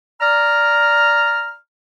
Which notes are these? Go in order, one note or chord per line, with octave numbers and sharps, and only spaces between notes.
D5 A#5 F6